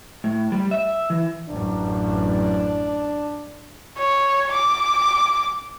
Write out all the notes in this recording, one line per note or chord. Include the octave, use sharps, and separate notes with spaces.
A2
G3
E5
E3
A1 F#2 D4
C#5
D6